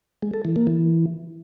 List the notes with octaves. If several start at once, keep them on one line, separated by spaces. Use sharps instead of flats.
G#3
A4
E3
A#3
E3